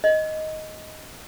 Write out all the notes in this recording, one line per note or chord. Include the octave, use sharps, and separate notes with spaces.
D#5